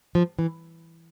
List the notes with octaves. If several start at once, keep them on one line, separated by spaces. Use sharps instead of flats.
F3
E3